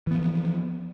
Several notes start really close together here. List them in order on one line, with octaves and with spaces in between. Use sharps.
E3 B3 F3